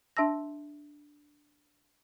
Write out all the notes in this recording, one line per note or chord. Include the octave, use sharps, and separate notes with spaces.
D4 E5 A5 E6 A#6